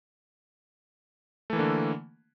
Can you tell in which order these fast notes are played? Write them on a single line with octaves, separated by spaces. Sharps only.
A3 E3 A#3 D3